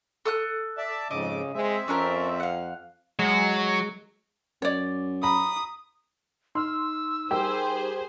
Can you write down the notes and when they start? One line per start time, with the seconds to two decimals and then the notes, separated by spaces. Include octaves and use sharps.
0.25 A4 D#6 F#6
0.78 D5 E5 A5
1.11 F2 G#2 C#3 D#5 D6
1.55 G#3 C4 E5
1.88 F2 C#4 D4 A#4
2.40 F5 F#5
3.19 F#3 G#3 F#4
4.62 F#2 C#5 D5
5.23 A#5 B5 D#6
6.55 D#4 C6 E6 F6
7.31 G3 G4 G#4 A#4 C5